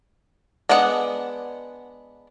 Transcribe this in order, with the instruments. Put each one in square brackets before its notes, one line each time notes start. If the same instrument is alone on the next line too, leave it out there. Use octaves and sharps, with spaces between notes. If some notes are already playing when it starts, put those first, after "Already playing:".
[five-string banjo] G#3 B3 D4 F#5